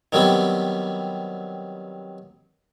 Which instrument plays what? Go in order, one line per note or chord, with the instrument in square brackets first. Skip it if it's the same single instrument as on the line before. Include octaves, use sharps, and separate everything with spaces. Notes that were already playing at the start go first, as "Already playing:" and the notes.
[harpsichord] D#3 F#3 G3 B3 C4